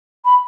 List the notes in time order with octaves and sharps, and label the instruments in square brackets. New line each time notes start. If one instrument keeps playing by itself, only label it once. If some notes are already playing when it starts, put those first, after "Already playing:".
[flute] B5